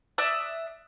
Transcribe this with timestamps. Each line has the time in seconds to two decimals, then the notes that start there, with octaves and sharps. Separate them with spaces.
0.18 D5 E5 D#6 F#6